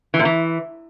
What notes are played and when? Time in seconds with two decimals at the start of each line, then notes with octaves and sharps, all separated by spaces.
0.14 E3
0.19 A#2
0.25 E3